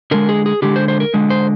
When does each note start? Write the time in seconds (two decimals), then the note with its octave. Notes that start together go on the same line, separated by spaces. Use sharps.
0.11 D3 G#3 A#4
0.29 G#4
0.46 G#4
0.62 D3 G#3 G4
0.76 C5
0.88 C5
1.00 A#4
1.14 D3 G#3
1.30 C5